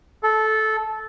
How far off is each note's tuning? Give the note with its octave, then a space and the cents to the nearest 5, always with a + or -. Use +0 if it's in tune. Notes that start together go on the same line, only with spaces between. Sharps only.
A4 -15